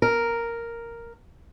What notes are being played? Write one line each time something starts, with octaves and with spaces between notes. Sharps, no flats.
A#4